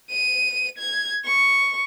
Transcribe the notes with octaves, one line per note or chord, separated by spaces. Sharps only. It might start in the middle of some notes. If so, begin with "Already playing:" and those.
D#7
G#6
C#6